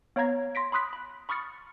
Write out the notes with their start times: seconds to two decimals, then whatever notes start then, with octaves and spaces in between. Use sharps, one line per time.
0.16 B3 C#5 F5 A#5 G#6 A#6
0.55 C6 A#6 B6 D7
0.72 B5 C6 D#6 F#6 B6
0.93 B5
1.29 B5 C#6 D#6 F6 A6 C#7